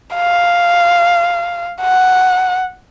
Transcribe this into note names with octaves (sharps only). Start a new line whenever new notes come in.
F5
F#5